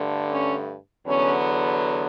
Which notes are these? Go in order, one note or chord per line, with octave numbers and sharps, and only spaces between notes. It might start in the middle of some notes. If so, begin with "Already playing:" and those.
Already playing: G2 D3 A3
C#4
E2 D3 F#3 B3 C#4